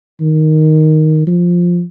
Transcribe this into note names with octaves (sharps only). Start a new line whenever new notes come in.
D#3
F3